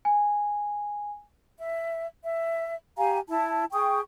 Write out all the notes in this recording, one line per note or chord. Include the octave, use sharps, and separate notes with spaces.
G#5
E5
E5
G4 F5 G#5 A#5
E4 A5
G#4 G5 C#6 D#6